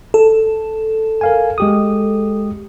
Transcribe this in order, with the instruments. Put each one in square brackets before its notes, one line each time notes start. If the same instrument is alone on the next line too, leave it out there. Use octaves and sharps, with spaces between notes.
[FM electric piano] A4
[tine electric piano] A#4 F5 G#5
G#3 G4 D#6